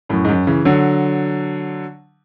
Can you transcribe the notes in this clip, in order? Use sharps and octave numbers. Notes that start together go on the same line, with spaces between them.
F#2 A2
G#2
F#2
C#3 E3
D3 F#3